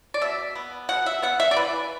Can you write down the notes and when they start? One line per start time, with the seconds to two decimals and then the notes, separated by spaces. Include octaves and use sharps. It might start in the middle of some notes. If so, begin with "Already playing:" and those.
0.14 D5
0.21 B2 E5
0.55 B3
0.89 B2 F#5
1.06 E5
1.22 B3 F#5
1.40 E5
1.51 D5
1.56 E3 B4